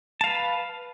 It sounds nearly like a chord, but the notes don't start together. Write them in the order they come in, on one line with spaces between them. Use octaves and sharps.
A5 F5 B4